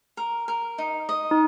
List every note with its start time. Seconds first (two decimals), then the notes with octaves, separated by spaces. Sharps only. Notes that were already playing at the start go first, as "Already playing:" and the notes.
0.17 A#4
0.48 A#4
0.78 D#4
1.09 D#5
1.31 D#4